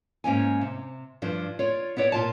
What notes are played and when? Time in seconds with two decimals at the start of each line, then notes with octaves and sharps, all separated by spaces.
0.24 G#2 A#3 C#4 G#5
0.61 C3
1.22 G2 F3 D4
1.59 F4 C#5 D5
1.97 B3 E4 C#5 D5
2.12 A#2 F4 A5